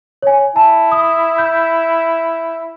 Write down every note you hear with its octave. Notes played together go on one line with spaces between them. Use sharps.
C#5 G#5
E4 A5
D#6
B5 G6